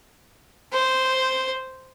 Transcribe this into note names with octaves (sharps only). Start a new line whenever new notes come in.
C5